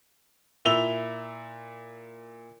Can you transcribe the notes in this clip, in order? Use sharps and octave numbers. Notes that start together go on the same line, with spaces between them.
A#2 E4 E6 F7 G7